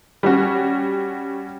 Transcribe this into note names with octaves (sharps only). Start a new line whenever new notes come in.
G3 C#4 F#4